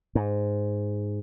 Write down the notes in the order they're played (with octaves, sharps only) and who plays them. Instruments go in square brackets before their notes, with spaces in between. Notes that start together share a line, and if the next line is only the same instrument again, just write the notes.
[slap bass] G#2